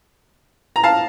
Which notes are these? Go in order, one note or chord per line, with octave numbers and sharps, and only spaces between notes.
A#5
F5 A5